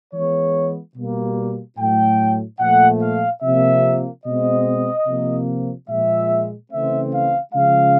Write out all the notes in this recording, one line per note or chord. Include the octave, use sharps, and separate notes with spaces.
E3 G#3 B3 C#5
B2 G3 A#3
A2 F#3 A3 G5
A#2 F3 A3 F#5
F5
C3 F3 A#3 E5
B2 G#3 C4 D#5
C3 F3 A#3
A#2 F3 G#3 E5
C#3 E3 A3 C4 E5
F5
C#3 F3 G#3 F5